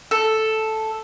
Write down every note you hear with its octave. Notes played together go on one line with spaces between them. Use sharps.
A4